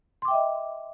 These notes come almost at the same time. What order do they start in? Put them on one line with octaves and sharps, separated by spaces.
C6 D6 G5 E5 D#5